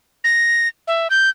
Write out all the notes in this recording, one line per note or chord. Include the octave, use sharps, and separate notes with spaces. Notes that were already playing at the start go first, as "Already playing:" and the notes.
A#6
E5
G6